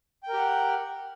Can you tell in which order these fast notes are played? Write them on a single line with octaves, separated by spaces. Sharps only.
G5 A#4 G4 F#5